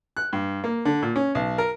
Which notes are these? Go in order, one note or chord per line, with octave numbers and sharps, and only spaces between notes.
F#6
G2
A#3
D3
A#2
C#4
B1
A#4